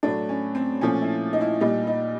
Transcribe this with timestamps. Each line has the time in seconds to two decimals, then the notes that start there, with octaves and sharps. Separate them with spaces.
0.03 A2 F#3 A3 D4
0.29 C#4
0.55 C4
0.81 A#2 F3 A3 C#4
1.02 E4
1.33 D#4
1.41 E4
1.60 A#2 G3 D#4
1.87 D#4